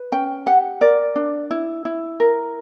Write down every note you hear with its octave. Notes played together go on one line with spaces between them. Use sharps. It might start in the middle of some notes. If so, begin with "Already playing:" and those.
Already playing: B4
C#4 G5
G4 F#5
A#4 D5
D4
E4
E4
A#4